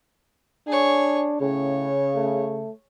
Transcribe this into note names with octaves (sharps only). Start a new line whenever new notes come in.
D4 G#4 C#5
A2 C#3 C#5
A3